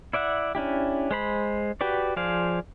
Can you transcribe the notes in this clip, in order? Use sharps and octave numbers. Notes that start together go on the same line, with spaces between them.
E4 D5 E5 F#5
C#4 D4 E4 G4
G#3 C5 B5
F#4 G4 B4 D5
F3 G#4 C5 D5 F5